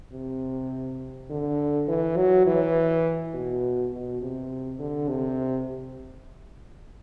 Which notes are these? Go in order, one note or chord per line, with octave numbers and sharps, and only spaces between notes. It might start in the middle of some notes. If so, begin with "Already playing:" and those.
C3
D3
E3
F#3
E3
B2
B2
C3
D3
C3